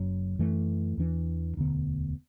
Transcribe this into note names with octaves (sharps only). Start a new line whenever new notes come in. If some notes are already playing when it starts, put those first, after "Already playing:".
Already playing: F#1 F#2 F#3
F#2 E3 A3
E2 E3 D4
E1 D2 D3 B3